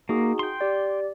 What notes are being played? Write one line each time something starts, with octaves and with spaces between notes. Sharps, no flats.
A#3 D#4 F#4 G#4
G5 C6
G4 D5